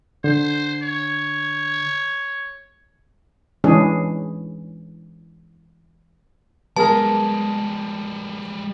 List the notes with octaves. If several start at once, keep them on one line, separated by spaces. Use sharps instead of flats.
D3 C5
C#5
E3 G#3 C#4 D4 G#4
G3 G#3 B3 G#4 A#4 A5